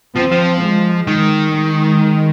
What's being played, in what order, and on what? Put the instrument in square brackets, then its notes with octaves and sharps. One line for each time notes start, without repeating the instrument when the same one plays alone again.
[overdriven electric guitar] F3 [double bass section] C4
[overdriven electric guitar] F3
[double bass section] G#3
[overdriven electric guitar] D#3
[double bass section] G#3